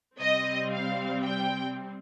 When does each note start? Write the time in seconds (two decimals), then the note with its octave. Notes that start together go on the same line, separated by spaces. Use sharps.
0.19 C3 G3 C4 D#5
0.71 F5
1.24 G5